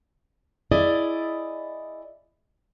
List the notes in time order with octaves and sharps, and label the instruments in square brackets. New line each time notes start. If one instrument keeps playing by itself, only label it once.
[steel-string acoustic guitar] E4 G#4 D5 D#5